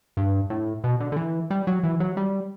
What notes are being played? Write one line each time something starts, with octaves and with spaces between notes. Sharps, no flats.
G2
A2
B2
D3
D3
E3
G3
F#3
E3
F#3
G3